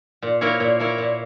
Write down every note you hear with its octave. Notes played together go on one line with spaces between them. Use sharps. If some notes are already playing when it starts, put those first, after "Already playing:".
A#2
A#3 E4 A#4 C#5
A#2
A#3 E4 A#4 C#5
A#2